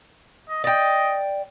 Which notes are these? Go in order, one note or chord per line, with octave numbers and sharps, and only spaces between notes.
D#5
D5 D#5 G5